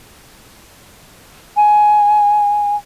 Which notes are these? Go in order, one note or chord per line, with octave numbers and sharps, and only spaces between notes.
G#5